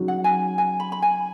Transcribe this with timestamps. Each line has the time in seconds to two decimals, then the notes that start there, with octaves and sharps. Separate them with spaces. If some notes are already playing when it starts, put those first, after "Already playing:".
Already playing: C#3 F#3 D#4 F#4
0.08 F#5
0.24 G#5
0.58 G#5
0.80 B5
0.92 B5
1.02 G#5